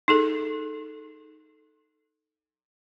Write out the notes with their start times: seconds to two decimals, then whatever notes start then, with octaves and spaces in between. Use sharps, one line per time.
0.08 D#4 G#4 A4